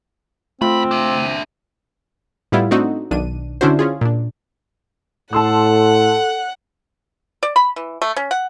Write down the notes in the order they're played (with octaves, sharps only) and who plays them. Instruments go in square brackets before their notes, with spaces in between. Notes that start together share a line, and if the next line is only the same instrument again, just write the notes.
[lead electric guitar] D#2 B5 [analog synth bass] A3 [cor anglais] C4 [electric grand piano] F4
[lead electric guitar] D4 E5
[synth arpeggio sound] A2 G3 B3 E4 F4
A3 C4 D4 D#4 F#4
B1 D#3 D4 D#7
D3 C#4 D4 E4 F#4 C5
C#4 F4 G#4
A#2 D4
[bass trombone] A2 [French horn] A4 [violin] F#5 [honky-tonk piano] A5 C6 E6
[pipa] D5
B5
E3
A3
C#4
F#5